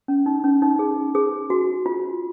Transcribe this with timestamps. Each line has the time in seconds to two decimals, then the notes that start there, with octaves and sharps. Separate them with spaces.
0.08 C#4
0.26 D#4
0.44 C#4
0.62 D#4
0.79 G#4
1.15 G#4
1.50 F#4
1.86 F4